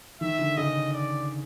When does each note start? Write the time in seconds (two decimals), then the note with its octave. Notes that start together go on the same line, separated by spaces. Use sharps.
0.21 D#3 E5
0.39 D3
0.57 C#3 D#5
0.93 D5